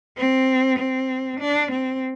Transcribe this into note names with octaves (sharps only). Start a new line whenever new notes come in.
C4
C4
D4
C4